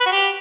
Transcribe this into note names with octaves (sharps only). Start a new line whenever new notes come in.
B4
F#4
G4